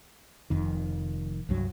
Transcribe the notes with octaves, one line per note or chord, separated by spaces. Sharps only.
F1 F2 D#3
C2 G2 F#3